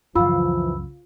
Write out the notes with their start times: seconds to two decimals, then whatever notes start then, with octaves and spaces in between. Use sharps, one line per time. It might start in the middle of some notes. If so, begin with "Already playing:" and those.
0.16 C#2 F#2 E3 F3 F4 B5 E6